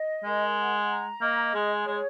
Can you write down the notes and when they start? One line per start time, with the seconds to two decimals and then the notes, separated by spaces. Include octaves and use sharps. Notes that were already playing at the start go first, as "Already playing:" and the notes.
Already playing: D#5
0.24 G#3 A#4
0.57 F#5
0.89 A#5
1.21 A#3 D#5
1.54 G#3 G#4
1.86 G#3 C#5